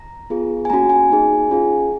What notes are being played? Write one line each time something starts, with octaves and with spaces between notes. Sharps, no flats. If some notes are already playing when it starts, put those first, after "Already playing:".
Already playing: A#5
B3 F4 G#4
G#5
A#3 C#4 F#4 A#5
G#5
A#3 D#4 G#4
C#4 F4 G#4